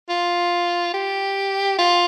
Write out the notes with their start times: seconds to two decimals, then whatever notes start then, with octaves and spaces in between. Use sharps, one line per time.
0.09 F4
0.94 G4
1.78 F4